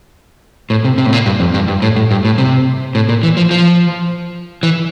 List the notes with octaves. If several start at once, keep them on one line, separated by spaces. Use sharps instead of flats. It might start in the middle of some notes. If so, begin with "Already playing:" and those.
A2
C3
C3
A2
A#2
G2
F2
G2
G2
A2
A2
G2
A2
C3
A2
A#2
E3
F3
F3
E3